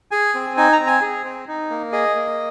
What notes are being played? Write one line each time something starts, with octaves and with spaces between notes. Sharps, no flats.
G#4 G#5
C4
D#4 G#5
A#5
C4
G#5
G#4
C4
D#4
A#3
G#4 D#5
A#3